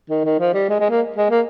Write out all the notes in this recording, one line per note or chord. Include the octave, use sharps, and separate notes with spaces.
D#3
D#3
F3
G3
G#3
G#3
A#3
G#3
A#3